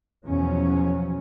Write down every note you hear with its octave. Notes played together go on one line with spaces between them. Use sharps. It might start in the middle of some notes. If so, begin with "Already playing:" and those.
E2 B2 F3 F#3 C#4